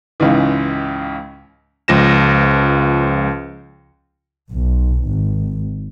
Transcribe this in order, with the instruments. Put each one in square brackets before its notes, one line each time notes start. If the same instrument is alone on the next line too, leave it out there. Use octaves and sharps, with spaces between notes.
[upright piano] C#2 G#2 C#3 E3
[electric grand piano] C#2 F3 A#6 E7
[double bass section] B1
G#1